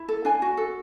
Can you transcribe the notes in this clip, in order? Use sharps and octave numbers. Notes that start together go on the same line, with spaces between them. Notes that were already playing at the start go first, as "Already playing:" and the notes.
Already playing: E4
A4
D4 G#5
F#4
A4